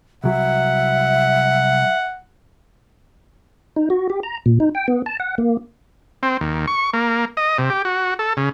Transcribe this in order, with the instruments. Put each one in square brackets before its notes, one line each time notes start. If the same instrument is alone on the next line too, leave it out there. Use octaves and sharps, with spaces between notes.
[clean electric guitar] C2 F#3 [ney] E5 [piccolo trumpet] F#5
[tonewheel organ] D#4
F#4
G4
A#5
A#2
D#4
G5
B3
A5
F#5
A#3
[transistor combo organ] C4
D#2
C#6
A#3
D#5
C3
G4
F#4
A4
C#3